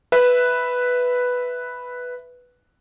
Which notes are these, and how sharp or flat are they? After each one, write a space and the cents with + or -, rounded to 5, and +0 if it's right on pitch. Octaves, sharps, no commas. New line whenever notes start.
B4 +0 E5 +0